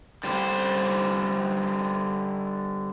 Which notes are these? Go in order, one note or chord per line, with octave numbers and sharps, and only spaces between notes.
D3 G3 C5